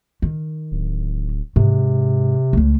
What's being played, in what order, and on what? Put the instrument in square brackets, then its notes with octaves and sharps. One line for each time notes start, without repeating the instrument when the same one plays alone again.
[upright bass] D#3
[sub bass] D1
[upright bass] G#2 [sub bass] C3
[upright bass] C#2 A3